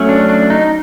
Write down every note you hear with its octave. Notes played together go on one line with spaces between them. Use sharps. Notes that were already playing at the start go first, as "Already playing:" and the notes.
Already playing: F#3 A3 C#4
D4
D4
D#4